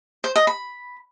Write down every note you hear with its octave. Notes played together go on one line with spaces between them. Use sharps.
C5
D#5
B5